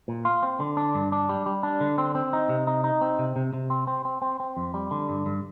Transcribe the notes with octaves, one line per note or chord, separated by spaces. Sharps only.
A#2
F4
C4
D3
D4
G2
D4
G3
G3
D4
D3
C4
C4
D#4
C3
D#4
D#4
C4
C3
C3
C3
C4
C4
C4
C4
C4
F2
G3
D3
G2
G2